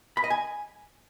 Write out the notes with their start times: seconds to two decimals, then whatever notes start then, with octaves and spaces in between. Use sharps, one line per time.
0.17 B5
0.24 D#5
0.30 G#5